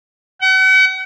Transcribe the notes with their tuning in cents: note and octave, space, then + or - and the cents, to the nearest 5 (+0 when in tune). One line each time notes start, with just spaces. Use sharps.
F#5 +40